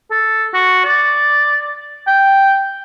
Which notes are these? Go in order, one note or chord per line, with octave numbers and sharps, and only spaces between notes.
A4
F#4
D5
G5